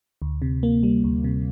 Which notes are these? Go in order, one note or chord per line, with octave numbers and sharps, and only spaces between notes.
D2
C3
A#3
G3
D2
C3